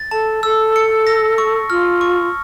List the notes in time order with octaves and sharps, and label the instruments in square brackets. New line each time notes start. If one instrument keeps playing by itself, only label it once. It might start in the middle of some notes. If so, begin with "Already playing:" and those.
Already playing: [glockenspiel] A6
[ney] A4 [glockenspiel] A5
[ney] A4 [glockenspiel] E6
[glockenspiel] C#7
A#6
C#6
[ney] F4 [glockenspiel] F6
[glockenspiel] C#6